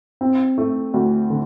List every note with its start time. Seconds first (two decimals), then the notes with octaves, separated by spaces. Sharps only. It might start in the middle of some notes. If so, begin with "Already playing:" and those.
0.21 C4
0.58 A3
0.94 D2
1.30 D3